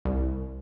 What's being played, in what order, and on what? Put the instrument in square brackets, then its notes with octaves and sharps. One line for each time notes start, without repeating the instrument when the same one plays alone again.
[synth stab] C2